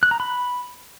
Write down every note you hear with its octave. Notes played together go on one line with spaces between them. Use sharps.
F#6
A#5
B5